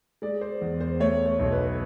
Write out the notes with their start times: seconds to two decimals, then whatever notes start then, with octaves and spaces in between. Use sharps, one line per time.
0.22 G#3 D5
0.41 C5
0.61 E2
0.81 C5
1.00 A3 C#5
1.26 C#5
1.39 B1
1.52 B4